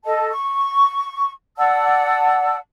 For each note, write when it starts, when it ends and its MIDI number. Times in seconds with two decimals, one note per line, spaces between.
0.04 0.30 69
0.04 0.30 75
0.04 0.30 81
0.30 1.31 85
1.57 2.56 74
1.57 2.56 78
1.57 2.56 81
1.57 2.56 88